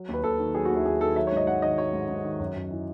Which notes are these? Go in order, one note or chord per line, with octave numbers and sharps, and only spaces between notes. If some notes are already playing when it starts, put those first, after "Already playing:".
Already playing: F#3
D#2
B4
D#2 A4
D#3
F#3 G#4
F#4
D#2
E4
D#2 G#4
D#3 A4
F#3 E5
C#5
G#2 D#5
G#2 F#5
D#3 D#5
F#3 C#5
G#2
G#2
D#3
F#2
F#2
E3